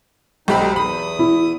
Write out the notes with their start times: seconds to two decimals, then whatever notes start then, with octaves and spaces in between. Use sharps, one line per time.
0.48 B1 D3 C4 D#4 G4 B5
0.76 E2 B5 D#6
1.19 E4